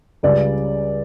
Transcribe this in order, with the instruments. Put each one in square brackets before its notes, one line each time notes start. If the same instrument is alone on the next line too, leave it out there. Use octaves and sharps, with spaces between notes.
[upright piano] C#2 C#3 G3 C#4 D5